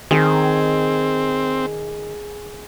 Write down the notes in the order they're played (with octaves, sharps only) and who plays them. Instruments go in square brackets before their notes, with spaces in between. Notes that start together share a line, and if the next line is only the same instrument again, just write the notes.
[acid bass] D#3 [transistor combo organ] C4 [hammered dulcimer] G#4